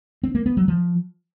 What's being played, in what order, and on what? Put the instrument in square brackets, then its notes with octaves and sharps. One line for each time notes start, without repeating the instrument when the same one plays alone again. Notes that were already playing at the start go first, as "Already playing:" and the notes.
[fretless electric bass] C4
A#3
B3
F#3
F3